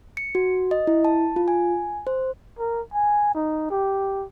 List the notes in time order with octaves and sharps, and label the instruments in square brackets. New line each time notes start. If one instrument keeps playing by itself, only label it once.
[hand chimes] C#7
F#4
D#5
E4
A5
F4
G#5
C5
[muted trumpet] A#4
G#5
D#4
G4